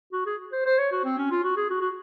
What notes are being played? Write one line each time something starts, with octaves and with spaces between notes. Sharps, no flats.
F#4
G#4
C5
C5
C#5
F#4
C4
C#4
F4
F#4
G#4
F#4
F#4